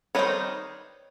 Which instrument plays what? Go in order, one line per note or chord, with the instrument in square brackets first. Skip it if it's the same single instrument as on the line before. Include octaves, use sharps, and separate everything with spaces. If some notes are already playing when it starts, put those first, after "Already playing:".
[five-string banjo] D#3 G3 C4 D#4 B4 C#5